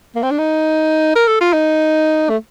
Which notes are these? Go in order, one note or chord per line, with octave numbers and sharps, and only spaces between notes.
A#3
C4
D4
D#4
A#4
A4
F4
D#4
A3